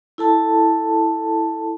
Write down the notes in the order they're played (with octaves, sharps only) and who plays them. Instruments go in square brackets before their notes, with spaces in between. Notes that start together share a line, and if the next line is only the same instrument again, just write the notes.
[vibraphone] E4 A4 A5